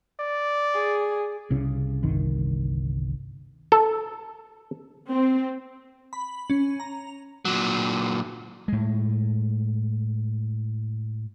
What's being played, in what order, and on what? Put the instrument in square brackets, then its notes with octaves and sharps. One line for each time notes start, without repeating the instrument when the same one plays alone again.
[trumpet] D5
[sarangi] G#4
[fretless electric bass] C2 C#3
G1 C2 D#3
[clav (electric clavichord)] A4
[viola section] C4
[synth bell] B5
C#4
A#5
[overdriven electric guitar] A#2 F#3
[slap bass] A2 G#3